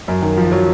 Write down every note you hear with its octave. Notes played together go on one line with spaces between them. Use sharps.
F#2
D#3
F3
F#3